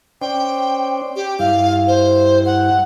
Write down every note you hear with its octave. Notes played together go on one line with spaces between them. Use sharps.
C#4 C5 D5 G5
G4
G2 E4 F5
C5
F#5